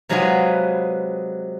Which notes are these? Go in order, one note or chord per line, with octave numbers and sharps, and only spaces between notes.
C3 F#3 G#3 F4 G#4 B4